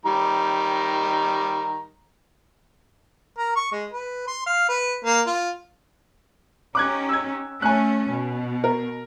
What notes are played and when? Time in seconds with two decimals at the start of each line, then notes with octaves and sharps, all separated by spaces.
0.05 D#3 G3 A#5
3.38 A#4
3.56 C#6
3.72 G#3
3.92 B4
4.27 C6
4.46 F5
4.69 B4
5.05 A#3
5.27 F4
6.75 C#4 D#4 G4 D6 F#6 G#6
7.09 E6 G#6
7.62 A3 C#4 G#5 F#6
8.10 B2
8.64 A#4